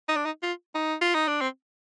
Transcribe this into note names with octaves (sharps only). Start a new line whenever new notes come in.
D#4
D4
D#4
F4
D#4
F4
D#4
D4
C4